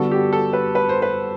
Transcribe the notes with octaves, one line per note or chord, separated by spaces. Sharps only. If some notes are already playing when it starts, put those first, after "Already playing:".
Already playing: D3 G3 B3 F#4 A4
G4
A4
B4
B4
C5
B4